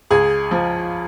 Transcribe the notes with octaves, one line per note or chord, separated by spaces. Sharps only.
C#2 G#4
F3